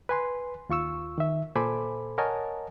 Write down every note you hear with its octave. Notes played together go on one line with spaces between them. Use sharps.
B4 G#5 C6
D#2 F4 C#6 E6
D#3 E5
A#2 A4 C5 G#5 B5 D6
A#4 C#5 D#5 F#5 G#5 A5